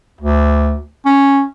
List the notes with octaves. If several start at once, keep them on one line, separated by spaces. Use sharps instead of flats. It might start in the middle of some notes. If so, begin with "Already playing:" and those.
D2
C#4